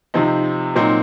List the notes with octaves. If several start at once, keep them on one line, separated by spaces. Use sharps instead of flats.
C3 F3 C4 D#4
A#2 F#3 C4 D#4